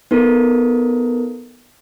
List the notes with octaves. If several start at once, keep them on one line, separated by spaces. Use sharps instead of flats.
B3 D#4 A4 A#4